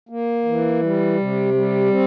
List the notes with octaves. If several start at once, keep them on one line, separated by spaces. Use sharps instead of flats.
A#3
E3
G3
C3
G3
C4